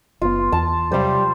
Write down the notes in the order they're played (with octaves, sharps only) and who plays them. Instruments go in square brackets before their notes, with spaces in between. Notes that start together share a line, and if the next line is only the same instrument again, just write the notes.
[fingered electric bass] F#1 A2 B3 [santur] F4
[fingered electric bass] E2 [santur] A5
[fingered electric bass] C3 F#3 [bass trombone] G3 [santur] C5 F5